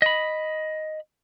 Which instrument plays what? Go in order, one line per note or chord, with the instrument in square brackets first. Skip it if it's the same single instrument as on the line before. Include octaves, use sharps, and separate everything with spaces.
[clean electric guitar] D#5 B5